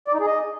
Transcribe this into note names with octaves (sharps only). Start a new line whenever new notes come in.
D5
D#4
G#4
D#5